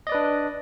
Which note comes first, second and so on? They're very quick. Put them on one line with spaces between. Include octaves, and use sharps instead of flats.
D#5 D5 B4 D4